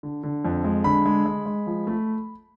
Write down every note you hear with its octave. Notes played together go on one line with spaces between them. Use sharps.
D3
D3
F2
G#3
D3 B5
G#3
G#3
G#3
F3
A3